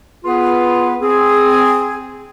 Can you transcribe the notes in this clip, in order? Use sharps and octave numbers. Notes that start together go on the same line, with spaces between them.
B3 F4 G#4 B4
C4 G#4